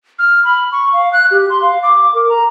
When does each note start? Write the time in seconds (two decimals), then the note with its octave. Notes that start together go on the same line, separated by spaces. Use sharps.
0.19 F6
0.45 B5
0.72 C#6
0.93 F5
1.13 F#6
1.31 G4
1.50 C6
1.62 F5
1.83 D6
2.14 A#4
2.29 A#5